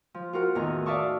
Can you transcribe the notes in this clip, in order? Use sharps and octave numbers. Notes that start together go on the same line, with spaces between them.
F3
F4 F#4 A#4 F#5
E2 A2 D#3 A#5
D5 E5 F5 A5 C#6 D#6